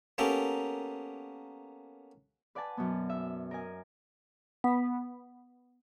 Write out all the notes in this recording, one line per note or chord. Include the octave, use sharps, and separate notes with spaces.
A#3 B3 C#4 G4 A4 A#4
B4 D5 F#5 G#5 A5
F#2 B2 B3
E5
A#4 D#5 G#5
B3